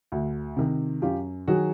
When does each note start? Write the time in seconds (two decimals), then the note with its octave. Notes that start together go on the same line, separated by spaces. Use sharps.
0.12 D2
0.57 C3 D#3
1.02 F#2 F4 G4
1.48 D#3 F#3 F#4 G#4